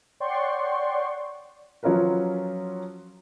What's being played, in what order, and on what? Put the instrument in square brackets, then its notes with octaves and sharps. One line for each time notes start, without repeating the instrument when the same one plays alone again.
[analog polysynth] C#5 D5 F#5 G5 C6 C#6
[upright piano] F3 F#3 C#4 F4 A#4 B4